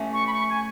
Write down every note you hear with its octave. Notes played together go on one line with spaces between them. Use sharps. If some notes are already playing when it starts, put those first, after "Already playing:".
Already playing: A3 C#4
C#6
B5
C#6
G#5